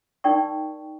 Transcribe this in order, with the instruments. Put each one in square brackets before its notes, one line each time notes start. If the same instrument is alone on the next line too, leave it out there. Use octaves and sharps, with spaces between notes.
[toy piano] D#4 A#4 D5 G5 C#6